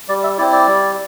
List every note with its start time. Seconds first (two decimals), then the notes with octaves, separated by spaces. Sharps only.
0.08 G3 D5
0.23 E5
0.38 C4 E4 D5
0.52 D5
0.67 G3